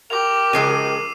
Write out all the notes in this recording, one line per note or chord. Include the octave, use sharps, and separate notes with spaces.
G4 A#4 D6 F7
C#3 F3 G#3 E6 C7 D#7